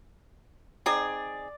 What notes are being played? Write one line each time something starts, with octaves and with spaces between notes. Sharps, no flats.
C4 D#4 G#4 D5